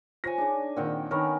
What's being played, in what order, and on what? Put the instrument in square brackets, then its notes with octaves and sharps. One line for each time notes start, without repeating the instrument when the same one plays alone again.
[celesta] F4 C5 [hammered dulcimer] C#5 G#5 [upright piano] A#6
[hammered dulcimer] D4 D6 [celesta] D#4 G#4 C#5
[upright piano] A#2 D#3 [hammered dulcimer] C4 F#5 G5
[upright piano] D#3 [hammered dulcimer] B3 C#4 A#4 [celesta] C#5 B5 C#6